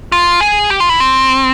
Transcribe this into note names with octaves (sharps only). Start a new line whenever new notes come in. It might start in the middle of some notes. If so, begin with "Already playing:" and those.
F4
G#4
G4
F4
E4
C4